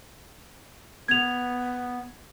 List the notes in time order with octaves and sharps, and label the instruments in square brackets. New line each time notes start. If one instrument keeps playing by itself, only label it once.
[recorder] B3 [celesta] G#6 F7